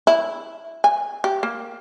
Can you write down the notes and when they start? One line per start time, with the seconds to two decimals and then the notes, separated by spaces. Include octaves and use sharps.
0.07 E4
0.84 G#5
1.24 G4
1.43 A#3